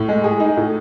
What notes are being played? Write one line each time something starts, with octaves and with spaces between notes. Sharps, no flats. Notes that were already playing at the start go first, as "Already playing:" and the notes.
Already playing: A2
G#3
G#4
D#4
A2